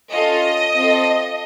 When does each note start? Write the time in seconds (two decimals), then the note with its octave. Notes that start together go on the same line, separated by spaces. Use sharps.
0.12 C#4 F4 A4 D#5
0.75 C4 F4 A4